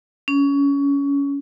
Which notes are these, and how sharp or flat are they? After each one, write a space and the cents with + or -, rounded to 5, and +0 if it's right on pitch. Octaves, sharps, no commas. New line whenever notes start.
C#4 +20